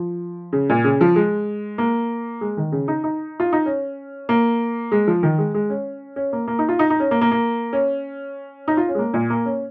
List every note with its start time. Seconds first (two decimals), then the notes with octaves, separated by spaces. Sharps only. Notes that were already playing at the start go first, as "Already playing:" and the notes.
Already playing: F3
0.53 C#3
0.69 A#2
0.84 C#3
1.01 F3
1.16 G#3
1.78 A#3
2.41 G#3
2.57 D#3
2.72 C#3
2.88 D#4
3.04 D#4
3.40 F4
3.53 D#4
3.66 C#4
4.29 A#3
4.92 G#3
5.07 F3
5.23 D#3
5.38 G#3
5.54 G#3
5.70 C#4
6.16 C#4
6.33 A#3
6.47 A#3
6.59 D#4
6.69 F4
6.79 D#4
6.90 D#4
7.00 C#4
7.11 A#3
7.21 A#3
7.31 A#3
7.73 C#4
8.68 D#4
8.77 F4
8.89 C#4
8.95 G#3
8.99 A#3
9.14 A#2
9.30 A#3
9.45 C#4